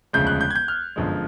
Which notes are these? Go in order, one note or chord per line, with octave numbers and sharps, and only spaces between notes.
E1 D2 C#3 F3 G#3 G6
F#6
G6
G#6
G6
F6
G1 F#2 D3 F3 G#3